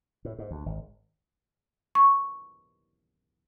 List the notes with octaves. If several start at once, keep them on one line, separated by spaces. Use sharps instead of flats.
A2
G#2
D2
G#1
C#6